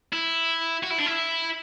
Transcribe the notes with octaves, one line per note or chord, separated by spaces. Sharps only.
E4
F#4
E4
D4
E4